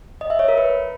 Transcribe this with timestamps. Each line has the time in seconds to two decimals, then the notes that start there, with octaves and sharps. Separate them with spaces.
0.21 D#5
0.30 E5
0.39 C#5
0.48 A#4
0.57 B4